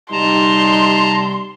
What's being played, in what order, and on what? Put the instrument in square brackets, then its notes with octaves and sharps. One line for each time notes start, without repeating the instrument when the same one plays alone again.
[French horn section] C3 G3 [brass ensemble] D#4 [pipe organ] A5 A#5 [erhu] C6